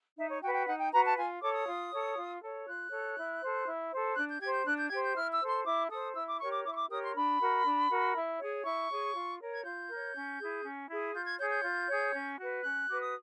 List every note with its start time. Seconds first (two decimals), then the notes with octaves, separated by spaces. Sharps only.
0.17 D#4 E5
0.29 C#5
0.42 F#4 G5
0.46 B4
0.54 G5
0.67 D#4 F#5
0.80 G5
0.92 F#4 B4 A#5
1.04 A5
1.17 F4 G#5
1.41 A4 C#5 D6
1.53 D#6
1.67 F4
1.91 A4 C#5
2.16 F4
2.42 A4 C#5
2.66 F4 F#6
2.91 A4 C#5
3.17 E4
3.41 A4 C5
3.67 E4
3.91 A4 C5
4.16 D4 F#6
4.29 G6
4.41 G4 C5 G#6
4.53 G6
4.65 D4 F#6
4.77 G6
4.90 G4 C5 G#6
5.03 G6
5.15 E4 F6
5.32 E6
5.40 A4 C5
5.48 C6
5.65 E4 D6
5.90 A4 C5 D#6
6.16 E4 E6
6.28 D6
6.40 G4 A#4 C#5 C#6
6.52 D6
6.64 E4 D6
6.72 C#6
6.77 D6
6.89 G4 A#4 C#5 D#6
7.03 C6
7.15 D4 B5
7.40 F#4 A#4
7.64 D4
7.89 F#4 A#4
8.14 E4
8.39 G#4 C#5
8.64 E4 C#6
8.90 G#4 C#5
9.15 F4
9.40 A#4 C#5
9.53 G#6
9.64 F4 G6
9.89 A#4 C#5
10.14 C#4
10.39 E4 G#4
10.63 C#4
10.89 E4 G#4
11.14 F4 G6
11.26 G#6
11.38 G#4 C#5 G6
11.50 G6
11.63 F4
11.89 G#4 C#5
12.13 C#4
12.38 F#4 B4
12.63 C#4 F#6
12.89 F#4 B4 D6
13.00 D#6